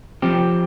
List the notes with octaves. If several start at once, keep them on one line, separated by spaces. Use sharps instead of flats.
F3 C4 G4